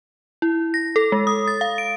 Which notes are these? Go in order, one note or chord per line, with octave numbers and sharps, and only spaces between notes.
E4
A#6
A4
G#3
D#6
A6
F5
D7